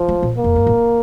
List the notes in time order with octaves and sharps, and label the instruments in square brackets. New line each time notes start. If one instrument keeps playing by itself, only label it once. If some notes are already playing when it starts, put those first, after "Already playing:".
Already playing: [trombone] F3
[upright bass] A3
A#2
[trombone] A#3
[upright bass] F2
G2
A2